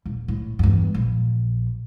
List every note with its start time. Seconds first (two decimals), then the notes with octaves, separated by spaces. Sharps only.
0.06 D#1
0.28 A2
0.59 E2 G2
0.94 A#1